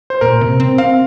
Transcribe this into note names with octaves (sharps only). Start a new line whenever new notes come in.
C5
A#2 A#4
C3
C4
C4 F5